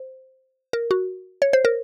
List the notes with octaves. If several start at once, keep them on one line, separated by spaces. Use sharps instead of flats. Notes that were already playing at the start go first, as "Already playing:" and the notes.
Already playing: C5
A#4
F#4
C#5
C5
A#4